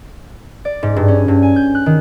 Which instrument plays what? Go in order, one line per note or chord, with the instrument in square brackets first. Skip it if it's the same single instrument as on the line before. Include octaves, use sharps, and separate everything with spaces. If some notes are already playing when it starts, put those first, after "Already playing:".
[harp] D5
G#2
G2
C#4
G2
G#5
G6
F#6
D#3